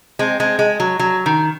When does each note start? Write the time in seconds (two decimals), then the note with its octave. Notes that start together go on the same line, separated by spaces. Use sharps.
0.19 G#3 C4
0.40 G#3 C4
0.59 G#3
0.80 F#3
0.99 F#3
1.26 D#3